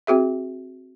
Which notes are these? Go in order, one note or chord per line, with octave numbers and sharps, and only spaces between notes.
C4 F#4 G#4 E5